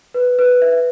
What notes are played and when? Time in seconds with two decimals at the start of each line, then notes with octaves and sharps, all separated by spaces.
0.14 B4
0.39 B4
0.62 E5